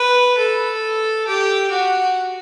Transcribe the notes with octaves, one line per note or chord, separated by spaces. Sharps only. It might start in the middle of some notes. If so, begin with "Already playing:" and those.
Already playing: B4
A4
G4
F#4